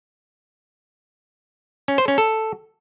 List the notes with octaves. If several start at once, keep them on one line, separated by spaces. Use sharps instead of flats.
C#4
C5
C#4
A4